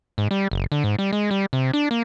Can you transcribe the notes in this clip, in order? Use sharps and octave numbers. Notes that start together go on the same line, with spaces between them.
G#2
G3
F#1
D3
G#2
G3
G#3
G3
C3
D4
A#3